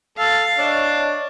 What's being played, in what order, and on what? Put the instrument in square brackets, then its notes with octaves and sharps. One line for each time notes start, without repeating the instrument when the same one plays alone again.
[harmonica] A4 [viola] F5 [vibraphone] E6
[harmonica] D4 [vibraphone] C#5 D#5 C#6